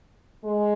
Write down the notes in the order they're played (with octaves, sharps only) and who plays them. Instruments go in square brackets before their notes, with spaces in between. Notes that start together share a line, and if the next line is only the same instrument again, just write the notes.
[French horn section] G#3